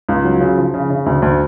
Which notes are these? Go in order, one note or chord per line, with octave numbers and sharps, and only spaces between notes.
C#2
F#3
C#3
F3
C#3
C#3
D2
D2